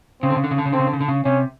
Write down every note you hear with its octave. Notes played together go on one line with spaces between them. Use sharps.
C#3 C4
D3
C#3
D3
C#3
D3
C#3
D3 C4
C#3
D3
C#3
D3
C#3
C3 C#4